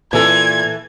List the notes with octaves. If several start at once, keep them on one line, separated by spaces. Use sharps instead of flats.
A#2 E3 A4 G#6